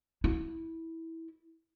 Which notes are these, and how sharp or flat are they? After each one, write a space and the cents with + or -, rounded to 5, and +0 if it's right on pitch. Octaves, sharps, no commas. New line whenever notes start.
E4 -15